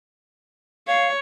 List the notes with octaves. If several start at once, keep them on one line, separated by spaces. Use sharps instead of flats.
C#5 F5